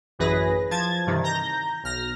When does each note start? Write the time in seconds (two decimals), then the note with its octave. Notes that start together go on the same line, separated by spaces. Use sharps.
0.19 A1 F#2 E3 G#4 B4 A#6
0.71 F3 A5 G#6 A6
1.06 G2 C3 D#3 E3
1.24 A#5 G6 A#6
1.83 B1 F6 A#6